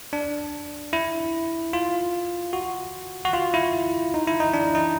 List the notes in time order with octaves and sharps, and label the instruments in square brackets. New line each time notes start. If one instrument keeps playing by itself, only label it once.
[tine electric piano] D4
E4
F4
F#4
F#4
F4
E4
D#4
E4
D#4
D4
D#4